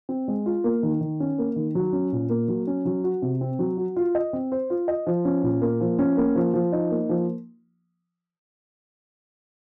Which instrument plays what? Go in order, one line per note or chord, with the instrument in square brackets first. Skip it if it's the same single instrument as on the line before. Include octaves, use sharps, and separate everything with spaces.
[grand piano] C4
G#3
F4
A#3
D#3
D#3
C#4
A#3
D#3
F#3
C#4
A#2
A#3
F#3
C#4
F#3
F#4
C3
C4
F#3
F#4
F4
D#5
C4
C5
F4
D#5
F3
C#4
A#2
A#3
F3
C#4
A#3
F3
F3
D#4
A#3
F3